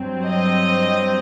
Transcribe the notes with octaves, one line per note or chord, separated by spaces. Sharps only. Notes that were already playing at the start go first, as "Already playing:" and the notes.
Already playing: G2 F#3 C4
D#5